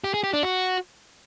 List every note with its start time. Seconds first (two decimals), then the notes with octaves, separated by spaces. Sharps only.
0.04 G4
0.14 G#4
0.24 G4
0.33 D4
0.43 F#4